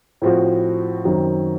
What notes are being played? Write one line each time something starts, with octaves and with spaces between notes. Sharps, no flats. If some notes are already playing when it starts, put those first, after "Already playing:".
A2 F3 C4 F#4
F#2 D#3 F#3 C4